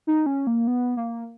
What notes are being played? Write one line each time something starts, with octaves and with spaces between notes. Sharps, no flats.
D#4
C#4
A#3
B3
A#3